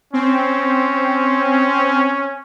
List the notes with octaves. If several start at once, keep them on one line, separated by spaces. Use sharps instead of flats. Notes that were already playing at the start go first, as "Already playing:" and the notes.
C4 C#4